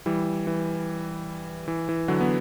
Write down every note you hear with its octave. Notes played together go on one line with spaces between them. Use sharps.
E3 G3
E3
E3
E3
D3 F#3
B3